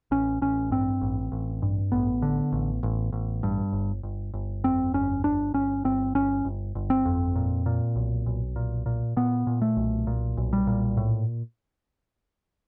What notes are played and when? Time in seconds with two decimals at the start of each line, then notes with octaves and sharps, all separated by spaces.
0.11 A1 C#4
0.42 A1 C#4
0.71 G2 C4
1.01 A1
1.32 A1
1.62 G2
1.92 A1 B3
2.22 D3
2.52 A1
2.83 A1
3.13 A1
3.43 G2
3.73 G1
4.03 G1
4.34 G1
4.64 F2 C4
4.94 G1 C#4
5.24 G1 D4
5.54 G1 C#4
5.84 G1 C4
6.15 G1 C#4
6.45 G1
6.75 G1
6.90 C4
7.05 F2
7.36 A#2
7.66 A#2
7.96 B1
8.26 B1
8.56 A#2
8.86 A#2
9.17 A#2 B3
9.47 A#2
9.62 A3
9.77 B1
10.07 A#2
10.37 B1
10.53 G3
10.67 A#2
10.97 A2